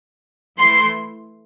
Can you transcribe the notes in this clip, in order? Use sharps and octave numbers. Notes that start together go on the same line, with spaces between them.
E3 A3 E4 C6